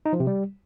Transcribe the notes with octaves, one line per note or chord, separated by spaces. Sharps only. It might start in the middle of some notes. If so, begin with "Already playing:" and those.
D#4
F3
C3
G3